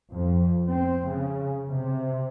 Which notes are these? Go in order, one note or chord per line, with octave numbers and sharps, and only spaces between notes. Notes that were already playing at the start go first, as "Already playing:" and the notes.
F2
C4
C#3
C3